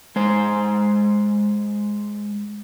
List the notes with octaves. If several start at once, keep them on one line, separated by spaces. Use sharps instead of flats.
G#3 C5